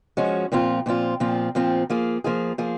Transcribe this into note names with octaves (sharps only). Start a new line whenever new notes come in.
F3 G#3 C#4 F#4
A#2 F3 C4 F4
A#2 F3 C4 F4
A#2 F3 C4 F4
A#2 F3 C4 F4
F3 A#3 F4 G#4
F3 A#3 F4 G#4
F3 A#3 F4 G#4